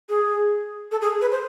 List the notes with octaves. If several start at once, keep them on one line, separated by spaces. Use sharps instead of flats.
G#4
A4
G#4
B4
C5